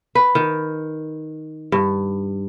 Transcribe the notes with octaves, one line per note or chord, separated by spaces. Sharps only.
B4
D#3
G2